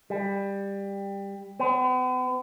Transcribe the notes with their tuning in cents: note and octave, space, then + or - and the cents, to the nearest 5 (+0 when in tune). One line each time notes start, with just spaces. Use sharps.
G3 +15
B3 +45